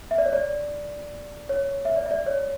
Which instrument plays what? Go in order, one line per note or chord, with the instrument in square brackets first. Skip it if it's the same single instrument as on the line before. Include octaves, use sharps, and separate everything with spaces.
[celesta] E5
D5
C#5
D5
C#5
E5
D5
E5
D5
C#5